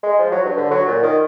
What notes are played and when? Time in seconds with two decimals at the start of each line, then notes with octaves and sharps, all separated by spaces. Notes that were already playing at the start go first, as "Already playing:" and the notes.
0.03 G#3
0.19 F3
0.32 F#3
0.45 G2
0.57 D3
0.71 F#3
0.87 A#2
1.03 D#3